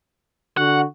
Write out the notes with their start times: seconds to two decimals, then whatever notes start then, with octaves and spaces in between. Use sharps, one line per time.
0.57 D3 F#4 F#5